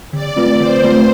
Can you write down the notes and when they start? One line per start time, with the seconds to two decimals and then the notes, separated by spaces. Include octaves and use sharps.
0.13 D3 D5
0.36 A3 C4 F4 B4
0.60 D3 C5
0.83 A3 C4 F4 B4